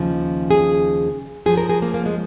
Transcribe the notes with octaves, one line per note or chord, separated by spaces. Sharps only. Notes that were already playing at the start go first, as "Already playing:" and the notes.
Already playing: D#2 C#3 F3
G#4
F#2 F3 G#4
A#4
G#4
A#3
A#3
G#3